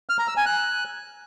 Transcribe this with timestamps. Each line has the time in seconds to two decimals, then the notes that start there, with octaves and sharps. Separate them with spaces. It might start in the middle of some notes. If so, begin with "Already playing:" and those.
0.09 F6
0.19 A#5
0.28 E6
0.37 G#5
0.46 F#6